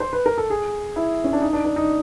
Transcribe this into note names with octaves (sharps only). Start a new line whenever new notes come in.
C5
B4
A#4
A4
G#4
E4
C#4
D4
D#4
D4
D4
D#4